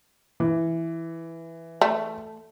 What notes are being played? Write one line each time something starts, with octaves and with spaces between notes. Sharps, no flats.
E3
A3